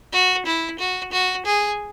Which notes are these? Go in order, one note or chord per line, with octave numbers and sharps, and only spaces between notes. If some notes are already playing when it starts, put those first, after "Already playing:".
F#4
E4
F#4
F#4
G#4